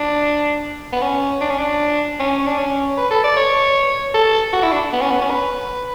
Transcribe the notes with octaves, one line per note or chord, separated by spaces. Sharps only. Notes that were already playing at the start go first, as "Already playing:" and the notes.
Already playing: D4
B3
C#4
D4
C#4
D4
C#4
D4
C#4
B4
A4
D5
C#5
A4
F#4
E4
D4
B3
C#4
B3
C#4
B4